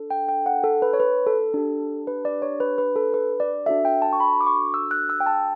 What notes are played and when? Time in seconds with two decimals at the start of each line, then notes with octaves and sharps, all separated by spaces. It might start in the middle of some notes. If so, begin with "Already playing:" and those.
Already playing: D4 A4
0.11 G5
0.29 G5
0.46 F#5
0.64 A4
0.82 B4
0.93 C#5
1.00 B4
1.26 A4
1.54 D4 G4
2.07 B4
2.25 D5
2.42 C#5
2.60 B4
2.78 B4
2.96 A4
3.14 B4
3.40 D5
3.66 D4 F#4 A4 E5
3.85 G5
4.02 A5
4.13 C#6
4.20 B5
4.41 D6
4.47 C#6
4.74 E6
4.91 F#6
5.09 E6
5.20 G5
5.26 A5